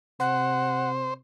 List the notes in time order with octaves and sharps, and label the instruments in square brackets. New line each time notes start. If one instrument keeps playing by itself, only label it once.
[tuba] C3 [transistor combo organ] C5 [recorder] F#5